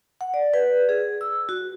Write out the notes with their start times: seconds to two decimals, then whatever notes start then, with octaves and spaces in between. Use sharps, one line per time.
0.21 F#5
0.34 D5
0.54 B4
0.89 G#4
1.21 E6
1.49 F#4